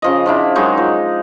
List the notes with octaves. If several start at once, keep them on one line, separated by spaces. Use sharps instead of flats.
C#3 F3 D#5
F3 D4 E4
D#3 F#3 G#3 D#4
F3